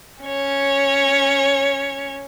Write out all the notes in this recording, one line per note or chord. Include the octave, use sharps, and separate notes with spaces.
C#4 C#5